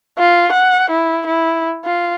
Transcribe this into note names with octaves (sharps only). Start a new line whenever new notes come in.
F4
F#5
E4
E4
F4